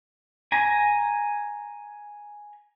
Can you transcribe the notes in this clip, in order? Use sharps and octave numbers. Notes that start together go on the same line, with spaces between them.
G#5 A#5